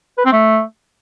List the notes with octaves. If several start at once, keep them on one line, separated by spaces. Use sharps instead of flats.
B4
C4
A3